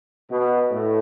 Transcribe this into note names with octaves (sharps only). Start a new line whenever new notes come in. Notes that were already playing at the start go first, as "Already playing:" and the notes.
B2
A2